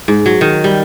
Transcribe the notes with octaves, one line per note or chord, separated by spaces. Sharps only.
G#2
F#3
D#3
G3